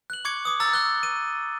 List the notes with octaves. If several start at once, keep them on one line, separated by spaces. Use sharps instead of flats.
F#6 F#7
C#6 D6 G#6 C#7
D6 D#6
A#5 E6 A6
F#6 G7
D#7